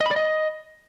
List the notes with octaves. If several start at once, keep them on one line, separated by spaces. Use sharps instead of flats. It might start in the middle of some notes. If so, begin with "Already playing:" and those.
D#5
B5
D5
D#5